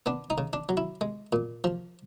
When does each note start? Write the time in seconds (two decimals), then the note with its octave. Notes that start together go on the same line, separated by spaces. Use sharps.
0.06 B3 D4
0.30 D#4
0.38 C#3
0.53 D4
0.69 F#3
0.77 E4
1.01 G#3
1.33 A#2
1.64 F3